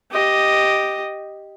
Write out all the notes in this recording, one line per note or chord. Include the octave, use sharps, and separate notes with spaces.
G4 D#5